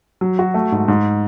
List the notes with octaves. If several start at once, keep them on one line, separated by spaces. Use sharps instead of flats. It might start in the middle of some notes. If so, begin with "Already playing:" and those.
F#3
F#4
A3
G#2
G#2